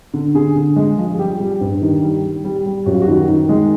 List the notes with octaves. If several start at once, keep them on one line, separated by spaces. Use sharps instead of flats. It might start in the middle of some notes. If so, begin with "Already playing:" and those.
D3
D3 G#4
D3
G#3
F3
G#4
G3 G4
G3
G2
D#3
G3
G3
G3
G3
F#2 F#4
F4
F#4
D#3
D#3
G#3